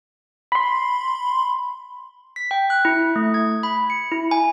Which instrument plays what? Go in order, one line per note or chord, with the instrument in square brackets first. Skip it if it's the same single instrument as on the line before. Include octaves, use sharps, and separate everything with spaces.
[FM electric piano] B5 C6
[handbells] B6
G5
F#6
E4
A3
G#6
B5
C#7
E4
G#5